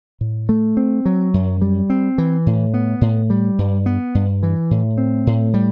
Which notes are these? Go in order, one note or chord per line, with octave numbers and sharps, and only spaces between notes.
A2
A3
C4
F#3
F#2
G3
C4
E3
A2
B3
A2
G3
G2
B3
G2
E3
A2
C4
A2
G3